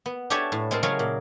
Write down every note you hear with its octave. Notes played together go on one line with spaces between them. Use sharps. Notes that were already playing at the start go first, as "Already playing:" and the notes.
B3
D4 G4 A4 C#5 E5 G#5
A2
G#3 C4 A4 A#4
C#3 F#3 A3 G#4 A#4 C#5
A#2